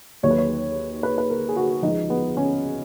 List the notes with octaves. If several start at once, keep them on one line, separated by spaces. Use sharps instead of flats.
D#2 D#3 F#3 C#5
B4
C#5
B4
B4
A#4
G#4
F#4
C#2 C#3 F3 D#4
B3
C#4